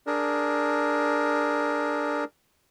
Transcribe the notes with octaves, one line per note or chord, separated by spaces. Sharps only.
D4 G#4 A#4